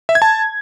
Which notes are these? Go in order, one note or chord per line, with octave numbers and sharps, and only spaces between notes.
E5
G#6
A5